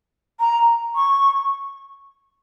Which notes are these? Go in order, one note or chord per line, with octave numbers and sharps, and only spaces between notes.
A#5
C#6